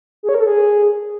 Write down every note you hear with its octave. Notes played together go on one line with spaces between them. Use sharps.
G#4
C#5
A#4
A4
G#4